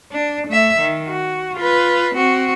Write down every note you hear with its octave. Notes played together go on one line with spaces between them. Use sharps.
D4
A3 E5
D#3
F#4
F4 B4
C4 F#4